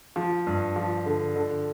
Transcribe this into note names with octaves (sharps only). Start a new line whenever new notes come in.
F3
G2
F3
D3
D3